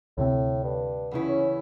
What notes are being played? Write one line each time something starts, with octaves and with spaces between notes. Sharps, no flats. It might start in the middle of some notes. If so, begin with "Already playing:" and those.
D2 A2 C3 C4
G2
E2 C#3 E4
C#4